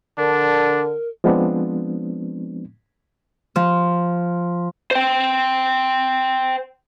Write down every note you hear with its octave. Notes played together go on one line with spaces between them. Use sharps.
D3 D4 A#4
F3 G#3 B3 C4 D4
F3
C5 G5